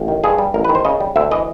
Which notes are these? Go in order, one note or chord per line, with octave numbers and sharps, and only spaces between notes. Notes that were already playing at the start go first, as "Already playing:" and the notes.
Already playing: A1
D#3
G2 G#4
G3
A1 A#4
B4
D#3
C5
C#3 D#5
G3
D2 E5
E3 D#5